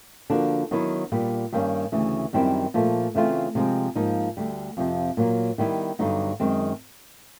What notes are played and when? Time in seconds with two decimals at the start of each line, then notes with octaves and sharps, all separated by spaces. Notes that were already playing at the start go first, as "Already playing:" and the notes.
0.30 D3 F3 A#3 D4 F#4
0.71 D#3 F#3 B3 E4
1.12 A#2 G3 B3
1.52 G2 D#3 G3 A#3 C#4
1.92 D2 C#3 E3
2.33 F#2 D#3 G3 C4 E4
2.74 A#2 F3 A3
3.15 C#3 E3 A3 C4 F4
3.55 C3 F3 G#3 C4
3.95 G#2 F3 A#3 D#4
4.37 D2 D3 G3
4.77 F2 C3 F3
5.17 A#2 F#3 A#3
5.58 D#3 G3 B3 E4
5.99 G2 D3 F#3 B3 D#4
6.40 F#2 D#3 G#3 C4